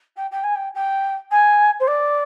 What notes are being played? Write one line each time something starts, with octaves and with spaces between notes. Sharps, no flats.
G5
G5
G#5
G5
G5
G#5
C5
D5